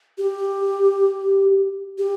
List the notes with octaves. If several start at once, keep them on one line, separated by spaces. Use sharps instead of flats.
G4
G4